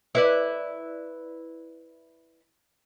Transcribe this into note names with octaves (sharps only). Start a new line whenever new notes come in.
E4 B4 D5